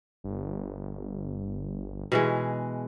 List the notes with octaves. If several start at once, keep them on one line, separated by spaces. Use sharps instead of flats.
G1
B2 E3 G#3